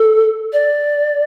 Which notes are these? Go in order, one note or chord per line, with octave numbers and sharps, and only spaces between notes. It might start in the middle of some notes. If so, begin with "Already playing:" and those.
Already playing: A4
D5